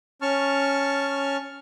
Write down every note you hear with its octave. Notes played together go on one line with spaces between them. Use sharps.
C#4 A5 C#6 F6